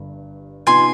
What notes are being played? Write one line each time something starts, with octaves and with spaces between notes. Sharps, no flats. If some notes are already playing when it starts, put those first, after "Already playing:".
Already playing: G1 G2
C3 F3 B3 D#4 G#5 C6